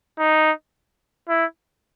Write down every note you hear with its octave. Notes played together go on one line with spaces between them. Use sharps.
D#4
E4